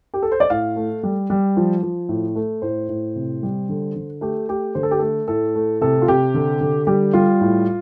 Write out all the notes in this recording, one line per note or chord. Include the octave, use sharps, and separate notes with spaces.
G4
A4
C5
D5
A2 F5
A3
G3
G3
F3
F3
A2
A3
A2 C5
A2
C3
G3
D3
D3
A3 G4
A3 G4
D3 C5
A4
G4
A3 A4
A2 A4
A3
C3 A4
F4
C3 G4
D3
D3
G3 G4
G3 F4
A2